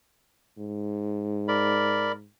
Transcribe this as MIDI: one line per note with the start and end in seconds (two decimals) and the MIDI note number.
0.58 2.29 44
1.48 2.12 70
1.48 2.12 74
1.48 2.12 83